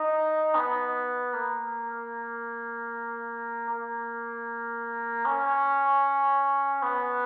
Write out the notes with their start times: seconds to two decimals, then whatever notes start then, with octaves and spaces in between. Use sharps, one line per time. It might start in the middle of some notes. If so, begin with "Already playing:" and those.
Already playing: D#4
0.55 B3
1.34 A#3
3.70 A#3
5.26 C#4
6.83 B3